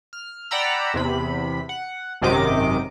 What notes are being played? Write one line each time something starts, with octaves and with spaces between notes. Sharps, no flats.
F6
D5 F#5 G5 A#5 B5 E6
E2 C3 B5
F#5
G#1 F#2 C3 D#3 D#5 D6